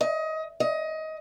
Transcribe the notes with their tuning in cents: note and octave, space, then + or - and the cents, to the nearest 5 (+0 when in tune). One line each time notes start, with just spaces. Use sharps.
D#5 +25
D#5 +20